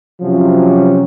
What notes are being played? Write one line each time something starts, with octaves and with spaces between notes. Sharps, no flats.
C3 F3 F#3 C#4